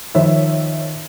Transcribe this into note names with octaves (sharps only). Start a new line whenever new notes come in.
D#3 F3 C#5 E5